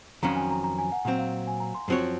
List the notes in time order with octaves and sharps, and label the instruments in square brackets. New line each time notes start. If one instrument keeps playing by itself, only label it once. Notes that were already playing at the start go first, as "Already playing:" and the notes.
[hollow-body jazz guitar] F2 D#3 F#3 C#4 F#4 [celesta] A#5
[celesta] G#5
A#5
A#5
G#5
F#5
[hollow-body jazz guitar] A#2 F#3 C4 [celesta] F#5
[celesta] F5
G#5
A#5
C6
[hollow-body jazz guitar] F#2 F3 C4 F#4 C#5